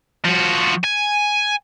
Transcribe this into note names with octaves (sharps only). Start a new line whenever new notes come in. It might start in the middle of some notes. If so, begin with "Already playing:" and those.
F3 F#4
G#5